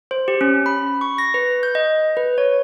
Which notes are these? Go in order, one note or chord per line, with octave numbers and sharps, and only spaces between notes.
C5
G4
C#4
B5
C#6
A#6
B4
G6
D#5
B4
C#5